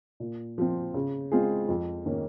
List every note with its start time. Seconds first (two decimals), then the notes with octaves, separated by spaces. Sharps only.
0.20 A#2
0.58 F3 C4
0.94 C#3
1.32 G#3 C4 F4 G#4
1.68 F2
2.06 D#3 A#3 C#4